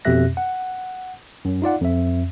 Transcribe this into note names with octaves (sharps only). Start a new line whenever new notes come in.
F2 B2 G4 E5 F#6 A#6
F#5
F#2
D#4 F4 D5 F#5
F2 E5